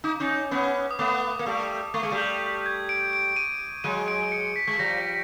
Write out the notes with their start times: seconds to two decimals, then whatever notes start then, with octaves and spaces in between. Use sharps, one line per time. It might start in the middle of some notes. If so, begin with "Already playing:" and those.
0.04 D#4 D6
0.20 C#4 D#4
0.51 B3 C#4
0.91 D#6
0.99 A3 B3 D6
1.39 A#3
1.46 G3 A3
1.94 A3 C#6
2.03 G#3
2.11 G3 A3
2.18 G6
2.66 G#6
2.89 D7
3.13 D7
3.36 D#7
3.84 F#3 G#3 D#7
4.08 D7
4.32 C#7
4.56 B6
4.67 G#3 B6
4.79 F3 G3 A#6